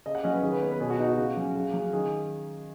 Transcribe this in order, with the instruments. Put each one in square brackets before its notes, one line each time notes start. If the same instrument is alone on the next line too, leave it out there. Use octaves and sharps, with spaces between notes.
[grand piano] C#3 D#5
F#5
F#3 C#4 D#5
B4
D#3 G#4
B4
B3 C#5
B4
B2 G#4
F#4
B3 D#4
F#4
C#3
F#3 C#4
C#3
F#3 C#4
D#3 G#4